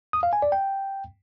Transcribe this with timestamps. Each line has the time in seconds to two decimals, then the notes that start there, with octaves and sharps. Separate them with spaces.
0.13 D#6
0.23 F5
0.33 G#5
0.42 D5
0.52 G5